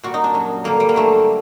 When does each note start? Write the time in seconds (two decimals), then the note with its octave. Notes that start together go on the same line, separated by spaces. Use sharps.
0.03 A#2 G3 F#4
0.14 D#4
0.24 D4
0.34 F#2 F#3
0.64 G2 D3 G3 A#3
0.80 G3
0.89 A#3
0.94 G2 D3 F#3 A3